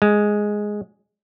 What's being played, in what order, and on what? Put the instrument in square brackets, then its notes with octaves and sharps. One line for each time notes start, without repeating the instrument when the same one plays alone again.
[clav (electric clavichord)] G#3